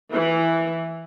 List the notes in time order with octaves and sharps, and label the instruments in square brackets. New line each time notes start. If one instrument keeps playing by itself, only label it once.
[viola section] E3